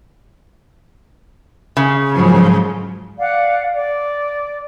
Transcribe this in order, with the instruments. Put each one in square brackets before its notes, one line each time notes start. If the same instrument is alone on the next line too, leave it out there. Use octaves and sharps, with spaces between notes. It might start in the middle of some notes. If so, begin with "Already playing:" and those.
[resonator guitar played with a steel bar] C#3
[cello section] G#2 F3 F#3
[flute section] D5 F5 F#5
D5